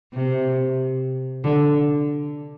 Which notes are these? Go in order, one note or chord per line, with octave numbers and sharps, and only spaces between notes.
C3
D3